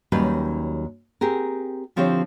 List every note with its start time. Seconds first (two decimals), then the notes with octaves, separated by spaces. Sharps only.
0.12 D#2 F#3 G3 C#4 D#4 B4
1.21 C4 G4 G#4 A#4
1.96 D3 F3 C4 E4 G4 C#5